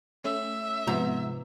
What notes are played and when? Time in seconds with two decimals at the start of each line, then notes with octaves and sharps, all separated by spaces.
0.24 A3 C#4 E5
0.87 G#2 C3 F3 B3 A#5